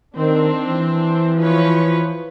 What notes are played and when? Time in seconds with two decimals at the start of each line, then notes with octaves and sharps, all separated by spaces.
0.17 D#3 C4 D4
0.68 E3
1.39 F3 B4 C#5